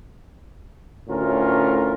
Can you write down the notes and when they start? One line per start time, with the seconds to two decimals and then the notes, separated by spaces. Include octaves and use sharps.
1.08 D2 A2 C#4 F4 A#4